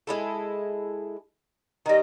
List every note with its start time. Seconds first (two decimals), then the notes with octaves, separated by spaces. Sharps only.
0.07 G#3 E4 A4
1.86 D#3 G3 D#5